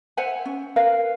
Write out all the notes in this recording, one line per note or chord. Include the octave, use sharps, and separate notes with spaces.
C5 E5 F#5 G#5
C#4
A#4 B4 F5